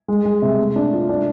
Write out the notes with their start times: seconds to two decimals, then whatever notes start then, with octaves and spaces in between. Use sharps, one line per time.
0.08 G#3
0.25 G#3
0.42 C3
0.59 A3
0.76 D4
0.93 F4
1.09 D4